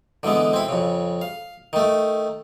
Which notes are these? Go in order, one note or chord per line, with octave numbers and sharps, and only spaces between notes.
D3 E3 G#3 B3
C4 E4
F2 C#3
F5
D#3 A3